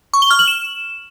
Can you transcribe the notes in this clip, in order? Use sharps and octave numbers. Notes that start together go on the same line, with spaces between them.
C#6
G7
F6
F#7
E7